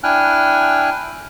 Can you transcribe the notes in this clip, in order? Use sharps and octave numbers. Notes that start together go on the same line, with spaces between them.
D4 E4 G5 G#5 F6 F#6